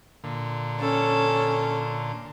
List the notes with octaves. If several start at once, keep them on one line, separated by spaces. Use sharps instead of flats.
A#2 D3
C#4 A4